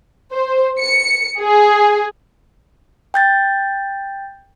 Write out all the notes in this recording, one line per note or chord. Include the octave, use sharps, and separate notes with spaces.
C5
C#7
G#4
G5 G6 A6